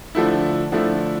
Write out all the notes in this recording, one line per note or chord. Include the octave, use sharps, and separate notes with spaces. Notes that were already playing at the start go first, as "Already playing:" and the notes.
D3 F3 A3 E4
D3 F3 A3 E4